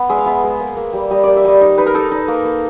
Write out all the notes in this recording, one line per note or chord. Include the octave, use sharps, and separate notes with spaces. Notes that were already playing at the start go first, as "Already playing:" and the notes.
Already playing: B3
G#3 E5
F5
B3 E5
G#3
A#3
A#3
G3
G3 D#5
A#3 D5
E5
G3 D#5
D#4
D#4 B4
A#4
D#4 A4
D#4
A#3
A#3